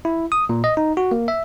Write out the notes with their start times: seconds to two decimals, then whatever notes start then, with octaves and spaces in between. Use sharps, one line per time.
0.05 E4
0.32 D#6
0.49 A#2
0.64 D#5
0.77 D#4
0.97 F#4
1.11 A#3
1.28 E5